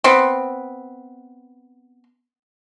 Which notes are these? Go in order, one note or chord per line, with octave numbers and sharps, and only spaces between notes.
B3 C4